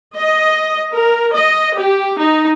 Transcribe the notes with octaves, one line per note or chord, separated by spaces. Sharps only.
D#5
A#4
D#5
G4
D#4